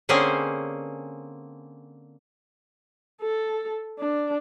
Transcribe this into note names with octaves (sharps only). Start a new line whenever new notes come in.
D3 A#3 C4 C#4 G#4 C5
A4
D4